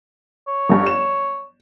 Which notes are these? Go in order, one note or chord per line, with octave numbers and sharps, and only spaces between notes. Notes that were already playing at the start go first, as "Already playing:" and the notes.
C#5
G1 G2
E7